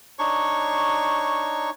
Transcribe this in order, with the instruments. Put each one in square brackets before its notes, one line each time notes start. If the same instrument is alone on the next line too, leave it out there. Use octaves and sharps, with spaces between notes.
[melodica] D4 D#4 C#5 C#6